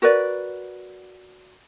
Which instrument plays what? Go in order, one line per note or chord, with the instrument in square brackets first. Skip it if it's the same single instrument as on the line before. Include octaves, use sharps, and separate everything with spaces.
[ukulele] F#4 A#4 B4 D5